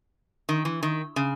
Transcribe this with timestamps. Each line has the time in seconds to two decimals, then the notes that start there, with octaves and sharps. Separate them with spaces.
0.49 D#3
0.65 E3
0.83 D#3
1.16 C#3